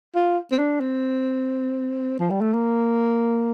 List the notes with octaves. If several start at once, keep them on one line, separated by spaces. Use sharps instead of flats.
F4
C4
D4
C4
F3
G3
A3
A#3